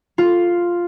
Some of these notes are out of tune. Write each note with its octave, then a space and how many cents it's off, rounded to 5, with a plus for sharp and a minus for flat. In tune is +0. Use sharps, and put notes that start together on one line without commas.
F4 +0